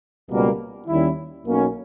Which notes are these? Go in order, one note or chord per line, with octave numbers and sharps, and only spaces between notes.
C#2 B2 G3 A#3
D#2 D#3 G3 C#4 E4
B1 B2 A#3 C#4